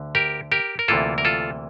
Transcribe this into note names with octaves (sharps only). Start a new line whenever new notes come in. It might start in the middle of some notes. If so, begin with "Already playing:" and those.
Already playing: D2 D3
G4 A#4
G4 A#4
A#4
D2 C3 E3 A#3 E4 F4 A4
A#4
F4 A4